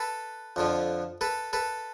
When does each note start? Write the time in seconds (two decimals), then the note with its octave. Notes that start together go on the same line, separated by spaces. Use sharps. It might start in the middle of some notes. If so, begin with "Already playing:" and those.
Already playing: A4 B4
0.56 F2 D3 F3
1.21 A4 B4
1.53 A4 B4